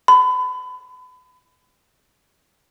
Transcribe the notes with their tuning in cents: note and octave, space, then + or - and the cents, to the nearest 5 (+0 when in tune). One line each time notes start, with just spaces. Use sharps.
B5 +30